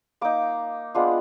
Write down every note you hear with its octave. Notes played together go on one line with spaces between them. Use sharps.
A#3 D#4 D6
G#3 B3 D4 F4